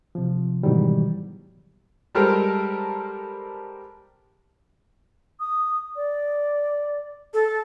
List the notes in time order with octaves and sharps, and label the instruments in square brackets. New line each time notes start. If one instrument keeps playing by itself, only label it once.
[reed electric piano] C3 F3
G#2 B2 D#3 E3 F#3 G3
[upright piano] G3 G#3 G4 A4 A#4 C5
[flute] D#6
D5
[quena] A4